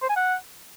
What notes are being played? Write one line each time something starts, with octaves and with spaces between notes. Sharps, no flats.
C5
G#5
F#5